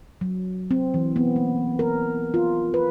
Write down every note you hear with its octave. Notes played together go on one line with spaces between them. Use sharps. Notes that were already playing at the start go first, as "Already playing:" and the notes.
F#3
C4
E3
B3
A#3
A#4
F4
B4